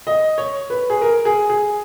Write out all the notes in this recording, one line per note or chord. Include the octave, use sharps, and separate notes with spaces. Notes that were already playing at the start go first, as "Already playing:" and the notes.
D#5
C#5
B4
G#4
A#4
G#4
G#4